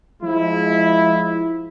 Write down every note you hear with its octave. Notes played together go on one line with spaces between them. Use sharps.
F3 G#3 E4